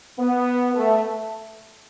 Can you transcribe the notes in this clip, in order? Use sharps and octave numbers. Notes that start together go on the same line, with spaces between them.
B3
A3